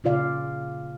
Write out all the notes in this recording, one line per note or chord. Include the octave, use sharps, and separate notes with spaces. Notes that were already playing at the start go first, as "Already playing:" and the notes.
A#2 C#3 F4 D5 F5